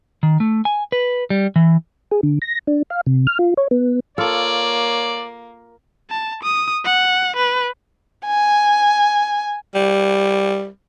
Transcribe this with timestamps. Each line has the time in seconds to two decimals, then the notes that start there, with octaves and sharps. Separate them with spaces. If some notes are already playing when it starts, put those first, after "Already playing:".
0.23 D#3
0.40 A3
0.65 G#5
0.92 B4
1.30 G3
1.56 E3
2.11 G#4
2.23 D3
2.42 A#6
2.67 D4
2.90 F5
3.07 C3
3.27 F6
3.39 F4
3.57 C#5
3.71 B3
4.18 A#3 F4 A4 C#5 D5
6.10 A5
6.43 D#6
6.85 F#5
7.37 B4
8.27 G#5
9.74 G3